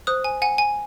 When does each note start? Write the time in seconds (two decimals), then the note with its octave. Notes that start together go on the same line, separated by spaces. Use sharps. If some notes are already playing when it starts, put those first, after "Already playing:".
0.07 C5 D#6 F#6
0.24 G#5
0.42 F#5 G#5
0.58 G#5